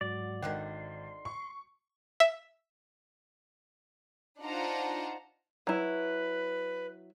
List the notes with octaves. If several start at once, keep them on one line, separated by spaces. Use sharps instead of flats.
G#2 F#3 F#4 D5
G#1 D3 D#3 F#5 C6
C#6
E5
D4 D#4 F4 C5 F#5 A#5
F#3 E4 B4